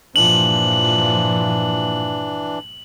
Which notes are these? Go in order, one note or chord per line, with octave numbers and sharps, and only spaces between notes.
G2 A#2 E3 F3 D4 F#7